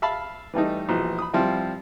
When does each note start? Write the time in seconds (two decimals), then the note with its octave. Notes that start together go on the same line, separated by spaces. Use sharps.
0.02 E5 F5 A5 B5 F6
0.53 E3 G3 A3 D#4
0.89 A#1 B2 E3
1.19 B5 D#6
1.33 F3 G3 C4 E4